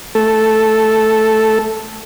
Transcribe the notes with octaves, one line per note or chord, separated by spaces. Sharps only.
A3 A4